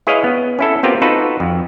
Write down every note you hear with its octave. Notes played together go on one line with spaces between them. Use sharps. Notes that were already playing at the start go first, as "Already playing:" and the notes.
E4 G#4 B4 C#5 D#5 F5
B3
C#4 E4 A4
B3 C4 F4 G4 A#4
D#4 F4 F#4 A4 B4
F2